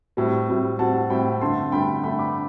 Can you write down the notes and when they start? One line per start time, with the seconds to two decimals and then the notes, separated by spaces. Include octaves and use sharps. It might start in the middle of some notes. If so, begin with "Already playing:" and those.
0.17 A2 G3 C4
0.48 A2 G3 C4
0.79 A2 G3 C4 F#5 A5
1.10 A2 G3 C4 G5 B5
1.41 G2 D3 A3 A5 C6
1.72 G2 D3 A3 G5 B5
2.03 G2 D3 A3 G5 B5
2.19 B5 D6